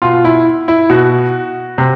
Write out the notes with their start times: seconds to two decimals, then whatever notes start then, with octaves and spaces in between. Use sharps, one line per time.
0.02 B2 F4
0.24 E4
0.68 E4
0.90 B2 F#4
1.78 C3